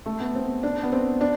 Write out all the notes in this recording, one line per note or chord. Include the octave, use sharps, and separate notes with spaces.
A3
B3
C4
D4
B3
C4
D4